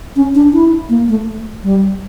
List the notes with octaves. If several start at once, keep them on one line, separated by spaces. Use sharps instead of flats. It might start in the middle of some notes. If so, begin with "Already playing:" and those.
C#4
D4
E4
A#3
A3
G3